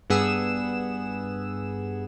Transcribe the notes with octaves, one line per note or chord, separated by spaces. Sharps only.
G2 B3 G#4 F#5 E6 E7